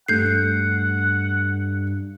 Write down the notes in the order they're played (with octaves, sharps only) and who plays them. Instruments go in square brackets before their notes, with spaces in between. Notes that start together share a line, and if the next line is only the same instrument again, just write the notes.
[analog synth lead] G2 [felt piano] A3 [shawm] F#5 [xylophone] G6 C7